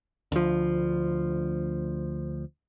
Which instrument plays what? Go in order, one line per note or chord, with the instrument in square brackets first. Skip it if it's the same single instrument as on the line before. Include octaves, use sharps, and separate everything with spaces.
[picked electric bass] D2 F3